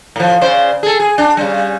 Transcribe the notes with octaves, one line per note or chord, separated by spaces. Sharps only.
A2 F3
C#3 C5 D5
G#4 A4
G#4
D4
C#3 G3